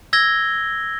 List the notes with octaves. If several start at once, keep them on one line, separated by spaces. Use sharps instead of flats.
E6 G#6 A#6 G7